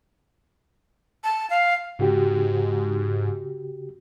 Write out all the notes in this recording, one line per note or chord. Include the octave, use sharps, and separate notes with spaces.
A5
F5
G#2 C#3 F#4 G4